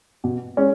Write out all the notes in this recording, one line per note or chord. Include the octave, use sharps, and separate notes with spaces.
B2
G#3 C#4